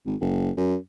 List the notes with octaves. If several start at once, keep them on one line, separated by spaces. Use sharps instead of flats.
G#1
F#1
F#2